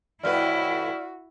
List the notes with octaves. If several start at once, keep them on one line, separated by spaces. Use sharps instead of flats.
F2 A2 E4 F#4 B4 D5 F6